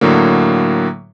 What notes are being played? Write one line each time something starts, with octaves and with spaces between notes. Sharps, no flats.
A2 D3 F#3 A#3